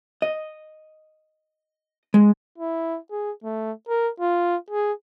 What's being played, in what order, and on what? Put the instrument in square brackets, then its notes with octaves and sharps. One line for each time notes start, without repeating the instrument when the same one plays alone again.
[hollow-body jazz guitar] D#5
G#3
[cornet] E4
G#4
A3
A#4
F4
G#4